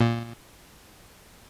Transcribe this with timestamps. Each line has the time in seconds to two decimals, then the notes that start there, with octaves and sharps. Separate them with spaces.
0.01 A#2